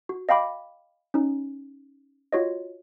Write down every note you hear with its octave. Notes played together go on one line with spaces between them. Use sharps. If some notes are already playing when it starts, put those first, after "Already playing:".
F#4
D#5 F5 G5 B5 D6
C#4 D#4
F4 F#4 C#5 D#5